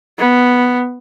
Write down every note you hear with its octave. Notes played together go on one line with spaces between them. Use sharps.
B3